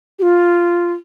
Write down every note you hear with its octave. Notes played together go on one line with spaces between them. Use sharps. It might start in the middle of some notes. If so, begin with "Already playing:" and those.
G4
F4